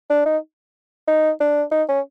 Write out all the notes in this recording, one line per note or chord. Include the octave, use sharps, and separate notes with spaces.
D4
D#4
D#4
D4
D#4
C#4